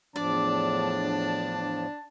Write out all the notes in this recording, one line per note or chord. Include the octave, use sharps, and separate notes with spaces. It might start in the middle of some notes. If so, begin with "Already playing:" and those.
E2 A2 F3 D4 D5 A5